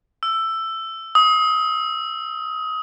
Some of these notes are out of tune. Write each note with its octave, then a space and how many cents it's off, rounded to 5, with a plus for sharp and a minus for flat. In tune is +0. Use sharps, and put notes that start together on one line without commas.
E6 +10
D#6 +25